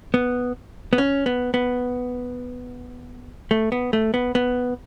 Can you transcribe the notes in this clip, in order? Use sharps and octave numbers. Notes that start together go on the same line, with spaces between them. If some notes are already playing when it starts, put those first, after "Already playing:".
B3
B3
C#4
B3
B3
A3
B3
A3
B3
B3